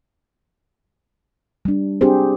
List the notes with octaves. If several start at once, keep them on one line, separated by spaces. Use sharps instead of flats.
G3 D4
C4 D4 G4 G#4 C5